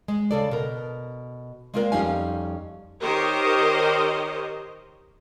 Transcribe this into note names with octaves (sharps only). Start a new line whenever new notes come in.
G#3
C#3 A4 D5
B2 A#4
G#3 A#3 C4 F4 A#4 D5
F2 G3 C#4 D#4 F5 G#5
D#3 G4 A#4 C5 C#5 D#5